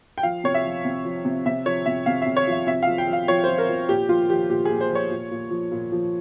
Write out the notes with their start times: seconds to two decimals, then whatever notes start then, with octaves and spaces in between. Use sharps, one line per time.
0.18 G5
0.23 F3 F5
0.44 C3 C#5
0.54 E5
0.64 F3
0.85 C3
1.05 F3
1.25 C3
1.46 C3 E5
1.66 F3 C#5
1.86 C3 E5
2.06 C3 F5
2.22 C3 E5
2.37 C#5
2.47 F3 E5
2.67 C3 E5
2.83 F3 F5
2.98 G5
3.07 F3
3.13 F5
3.28 F3 C#5
3.44 F3 C5
3.58 A#4
3.69 F3
3.89 A#2 G4
4.09 F3 F4
4.29 F3 G4
4.50 A#2 G4
4.65 A#2 G#4
4.81 C5
4.91 F3 C#5
5.11 A#2
5.31 A#2
5.51 F3
5.72 A#2
5.92 F3